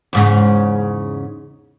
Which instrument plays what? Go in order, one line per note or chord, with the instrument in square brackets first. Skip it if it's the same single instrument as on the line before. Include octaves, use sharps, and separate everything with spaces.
[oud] E2 G#2 C#3